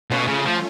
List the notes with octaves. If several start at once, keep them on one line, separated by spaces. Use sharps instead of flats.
B2 A3 C#4 F4
C#3
F3